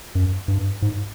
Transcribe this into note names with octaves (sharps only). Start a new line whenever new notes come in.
F#2
G2
G#2